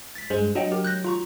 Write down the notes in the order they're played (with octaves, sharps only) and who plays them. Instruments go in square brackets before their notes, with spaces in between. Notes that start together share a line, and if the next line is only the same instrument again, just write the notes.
[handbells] A6 B6
[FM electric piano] G2 G#3 [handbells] C5
[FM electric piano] F#3 [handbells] D4 D#5 G5
[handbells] G4 A#4
F#6 G6 A#6
F4 A#5 C#6